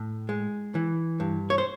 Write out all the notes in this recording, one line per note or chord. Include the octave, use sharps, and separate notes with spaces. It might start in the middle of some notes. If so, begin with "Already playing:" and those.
Already playing: A2
G#3
E3
G2
C#5
C5